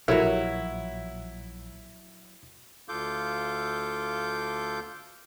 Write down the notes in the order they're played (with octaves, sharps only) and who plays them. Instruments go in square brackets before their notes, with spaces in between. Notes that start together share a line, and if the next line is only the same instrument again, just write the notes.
[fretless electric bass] A#1 [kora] F#3 C#5 [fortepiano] E4 [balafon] G4 A4 A#4
[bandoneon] D2 F4 A4 F5 D6 G6